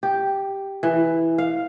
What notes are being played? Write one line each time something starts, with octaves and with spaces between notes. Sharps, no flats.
G4
E3
F5